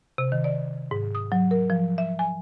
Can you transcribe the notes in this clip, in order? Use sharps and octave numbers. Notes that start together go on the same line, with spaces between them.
C3
D#3
D5
G#2
D#6
F#3
A#4
F3
E5
G#5